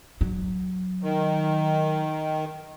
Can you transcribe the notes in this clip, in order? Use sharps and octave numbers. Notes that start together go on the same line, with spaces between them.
F#3
D#3